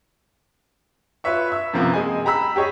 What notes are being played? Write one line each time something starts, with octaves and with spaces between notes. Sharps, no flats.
F4 B4 C#5 E5 C#6
E5 E6
F#2 C3 F3 A#3 B3
G#3 G#5
G4 A#5 B5 E6 B6
G4 G#4 C#5 D#5